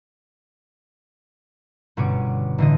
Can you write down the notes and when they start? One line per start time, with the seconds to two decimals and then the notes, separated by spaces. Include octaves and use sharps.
1.97 G1 B2 C#4 C#5 D6
2.58 A1 D3 D#5